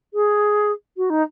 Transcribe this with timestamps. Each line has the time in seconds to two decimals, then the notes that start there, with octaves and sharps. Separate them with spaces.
0.13 G#4
0.97 F#4
1.09 D#4